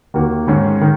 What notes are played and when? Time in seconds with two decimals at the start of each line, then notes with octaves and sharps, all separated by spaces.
0.14 D#2 D#3 A#3 F#4
0.47 G#2 D#3 G#3 C#4
0.81 D#3